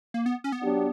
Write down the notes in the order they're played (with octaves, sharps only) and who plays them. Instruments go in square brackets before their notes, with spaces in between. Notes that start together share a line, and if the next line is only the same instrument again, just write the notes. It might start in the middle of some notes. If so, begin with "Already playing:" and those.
[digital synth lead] A#3
B3
C#4
B3
[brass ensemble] F#3 D4 G4